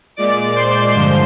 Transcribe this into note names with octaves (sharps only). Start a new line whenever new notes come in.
A#2 G#3 D5 D6
C5 C6
G2 D3 F3 G#3 C5 C6